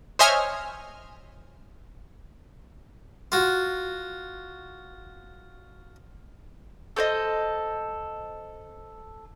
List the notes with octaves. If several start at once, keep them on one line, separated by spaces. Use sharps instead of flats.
C5 C#5 D#5 E5 G#5 F6
F4 F#4
A4 C5 D5 D#5